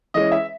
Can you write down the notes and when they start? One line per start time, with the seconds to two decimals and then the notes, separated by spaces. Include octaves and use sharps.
0.14 E3 G#3 C#4 D#5
0.32 E5